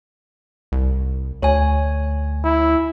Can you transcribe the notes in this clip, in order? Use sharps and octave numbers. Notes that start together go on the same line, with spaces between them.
C2
D2 C#5 G#5
E4